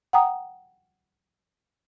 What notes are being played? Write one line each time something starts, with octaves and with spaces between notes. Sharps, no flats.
F#5 G5 A#5 D#6